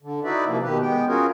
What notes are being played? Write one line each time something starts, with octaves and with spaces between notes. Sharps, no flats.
D3
D#4 E4 F#4 B4 D5 E5
C3 F3 A#3
B2 D#3 G4 B4
G#3 B3 G5
C#4 F4 F#4 G#4 A#4 C#5